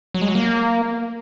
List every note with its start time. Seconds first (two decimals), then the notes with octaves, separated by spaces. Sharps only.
0.14 F#3
0.21 G#3
0.28 F#3
0.35 A#3